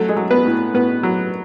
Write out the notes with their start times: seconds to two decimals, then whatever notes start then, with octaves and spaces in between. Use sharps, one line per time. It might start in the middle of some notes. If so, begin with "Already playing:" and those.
Already playing: F#3 A3 A4
0.09 G#3 G#4
0.17 F#3
0.31 B3 B4
0.46 A2
0.74 A2 B3 B4
1.03 F#3